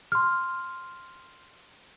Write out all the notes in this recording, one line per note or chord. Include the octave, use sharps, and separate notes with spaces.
C6 F6